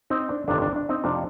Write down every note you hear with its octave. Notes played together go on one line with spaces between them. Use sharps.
C4 D#4
D4
G1 F2 C3 D#3 A#3 D4
D4
D4
C4 D#4
F2 C3 F3 D4 F4